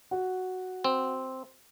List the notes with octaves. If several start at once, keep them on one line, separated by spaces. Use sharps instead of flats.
F#4
C4